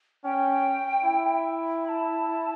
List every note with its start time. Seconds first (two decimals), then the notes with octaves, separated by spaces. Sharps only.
0.24 C#4 G5
1.04 E4
1.84 B5
1.89 A5